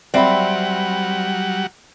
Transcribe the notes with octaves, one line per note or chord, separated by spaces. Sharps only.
F#3 G3 C4 D5 E5 F#5 B5